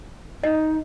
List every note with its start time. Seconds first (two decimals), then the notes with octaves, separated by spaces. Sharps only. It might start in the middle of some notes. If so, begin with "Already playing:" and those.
0.44 D#4 D#5